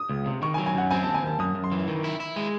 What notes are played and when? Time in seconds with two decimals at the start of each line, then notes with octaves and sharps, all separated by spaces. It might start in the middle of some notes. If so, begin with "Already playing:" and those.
Already playing: D#6
0.09 C#2
0.26 C3
0.42 D#3 C#6
0.54 G#5
0.58 F#3
0.66 G#5
0.75 F#2 F#5
0.91 C4 G#5
1.03 A5
1.07 D#2
1.14 G#5
1.23 D#2 A5
1.39 F#2 D#6
1.55 F#2
1.64 C6
1.72 E3
1.88 D#3
2.04 E4
2.20 E4
2.36 G#3